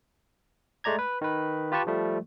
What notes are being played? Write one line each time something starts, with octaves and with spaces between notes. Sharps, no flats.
G#3 A3 D5 A#5 G#6
B4
D#3 B4
F4 G4 B4 A5 C#6
F3 G3 A3